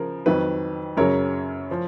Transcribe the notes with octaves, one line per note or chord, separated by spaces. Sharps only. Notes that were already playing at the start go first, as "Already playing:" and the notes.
Already playing: C#3 F3 A#4
F2 D#3 F#3 B4
F#2 C#3 F#3 A#4 C#5
F3